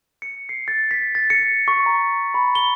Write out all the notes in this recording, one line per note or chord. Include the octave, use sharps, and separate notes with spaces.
C#7
C7
A6
B6
A6
C#7
C#6
A#5
B5
G7